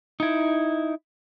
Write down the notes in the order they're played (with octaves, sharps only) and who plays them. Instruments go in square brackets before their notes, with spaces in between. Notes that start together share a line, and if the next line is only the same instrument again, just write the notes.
[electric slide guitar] D#4 E4